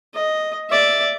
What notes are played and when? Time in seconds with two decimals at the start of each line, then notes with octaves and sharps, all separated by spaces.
0.14 D#5
0.70 D5 E5